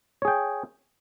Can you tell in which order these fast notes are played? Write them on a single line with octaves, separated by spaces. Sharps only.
C#5 G#4 G5